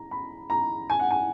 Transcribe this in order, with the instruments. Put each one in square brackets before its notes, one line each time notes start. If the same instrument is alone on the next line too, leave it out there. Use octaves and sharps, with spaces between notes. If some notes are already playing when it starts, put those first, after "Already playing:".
Already playing: [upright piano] A#5
B5
A#5
G#5
F#5
G#5